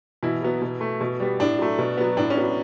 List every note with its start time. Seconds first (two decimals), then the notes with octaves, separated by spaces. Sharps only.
0.23 B2 E3 E4
0.42 F#3 B3
0.62 B2
0.81 A3
1.01 B2
1.20 G3 B3
1.40 A2 D4
1.58 F#3 A3
1.78 B2
1.97 F#3 B3
2.17 A2 D4
2.30 C#4
2.36 F#3 B3